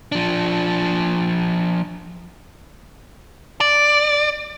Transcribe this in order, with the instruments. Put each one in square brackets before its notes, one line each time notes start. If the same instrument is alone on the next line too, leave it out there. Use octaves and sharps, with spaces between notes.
[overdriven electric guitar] F3 D4
[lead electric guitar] D5